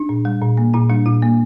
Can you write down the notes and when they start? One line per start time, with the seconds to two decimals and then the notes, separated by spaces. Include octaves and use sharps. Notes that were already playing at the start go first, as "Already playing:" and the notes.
Already playing: D4
0.09 A#2
0.25 G3
0.42 A#2
0.57 A#3
0.74 A#2 E4
0.89 G3 D4
1.06 A#2 E4
1.22 A#3